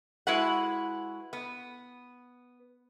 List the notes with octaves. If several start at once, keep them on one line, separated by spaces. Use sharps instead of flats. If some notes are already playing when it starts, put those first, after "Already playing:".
G#3 E4 F#4 B4 F#5
B3